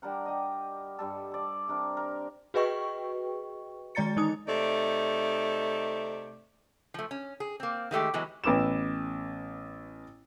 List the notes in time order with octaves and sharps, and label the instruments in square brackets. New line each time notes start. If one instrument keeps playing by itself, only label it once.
[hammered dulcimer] G3 D4 A#4 F#5
G4 D#5
G2 G3 A4
A4 D5
C3 D4 A#4
A#4
[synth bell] F#4 G#4 B4 D#5 G5 C#6
D#3 G#3 D5 A#5 A6 C#7
E3 D#4 D#6
[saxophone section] C3 A3 D#4 D5
[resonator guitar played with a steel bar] F3 A3
C#4
G#4
A#3 C4
D#3 G#3 A3 G4
E3 F#3 G#3 B3
[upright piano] A1 B3 D6 E6 E7